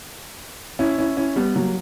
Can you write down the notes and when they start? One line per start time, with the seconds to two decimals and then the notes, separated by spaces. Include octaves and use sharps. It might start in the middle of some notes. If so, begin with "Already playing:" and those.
0.79 C#4 E4
0.98 C#4 E4
1.17 C#4 E4
1.36 G3 B3
1.55 F#3 A#3